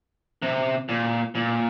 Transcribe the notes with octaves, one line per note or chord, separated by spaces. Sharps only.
C3
A#2
A#2